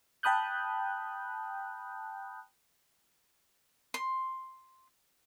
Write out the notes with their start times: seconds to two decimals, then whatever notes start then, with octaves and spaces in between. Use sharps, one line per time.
0.23 G5 A5 B5 D#6 F#6 G6
3.94 C6